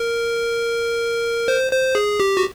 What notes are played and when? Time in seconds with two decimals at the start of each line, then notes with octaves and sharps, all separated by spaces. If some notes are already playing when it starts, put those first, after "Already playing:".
Already playing: A#4
1.48 C5
1.72 C5
1.95 G#4
2.20 G4
2.37 F#4